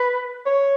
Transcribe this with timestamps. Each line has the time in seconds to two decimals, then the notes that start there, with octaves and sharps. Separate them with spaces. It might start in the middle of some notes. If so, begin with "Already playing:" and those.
Already playing: B4
0.46 C#5